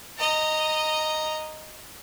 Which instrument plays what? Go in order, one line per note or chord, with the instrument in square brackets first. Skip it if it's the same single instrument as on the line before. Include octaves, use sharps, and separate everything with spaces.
[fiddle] D#5 A#5